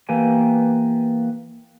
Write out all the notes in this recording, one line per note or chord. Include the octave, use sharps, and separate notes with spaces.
E3 A#3 B3 G4 G#5